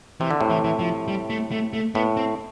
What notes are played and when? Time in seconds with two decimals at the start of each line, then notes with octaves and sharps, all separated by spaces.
0.21 C3 E3
0.31 D3
0.40 A2 C3
0.50 E3
0.64 E3
0.79 F3
1.08 G3
1.30 A3
1.52 A3
1.73 A3
1.95 A2 B3
2.17 C4